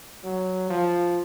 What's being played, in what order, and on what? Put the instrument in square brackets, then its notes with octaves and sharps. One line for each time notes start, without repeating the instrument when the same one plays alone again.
[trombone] F#3
F3